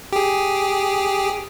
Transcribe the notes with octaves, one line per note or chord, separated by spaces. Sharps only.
G4 G#4